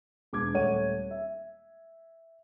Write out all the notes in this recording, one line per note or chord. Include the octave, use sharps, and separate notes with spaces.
E1 D6 G#6
D#1 A3 C#5 F#5 D#7
E5